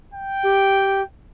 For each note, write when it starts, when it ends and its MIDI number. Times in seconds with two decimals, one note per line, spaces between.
0.14 1.04 79
0.43 1.02 67